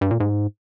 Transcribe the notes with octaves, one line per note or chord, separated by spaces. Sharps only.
G2
A#2
G#2